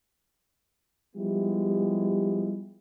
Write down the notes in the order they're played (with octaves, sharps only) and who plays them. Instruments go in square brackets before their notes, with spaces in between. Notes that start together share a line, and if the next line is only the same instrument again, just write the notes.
[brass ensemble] F3 G3 G#3 B3 E4 G4